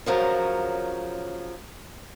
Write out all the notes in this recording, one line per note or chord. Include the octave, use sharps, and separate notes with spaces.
C#3 F3 F#3 A#4